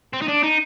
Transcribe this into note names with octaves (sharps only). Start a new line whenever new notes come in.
C4
D#4
D4
D#4